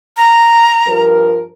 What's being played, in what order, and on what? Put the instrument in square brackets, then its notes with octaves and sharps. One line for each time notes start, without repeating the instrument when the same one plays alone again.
[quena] A#5
[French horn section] G2 F3 A#4